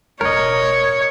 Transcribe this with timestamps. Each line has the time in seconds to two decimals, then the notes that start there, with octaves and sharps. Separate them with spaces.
0.21 E1 A2 A#4 C#5 D#5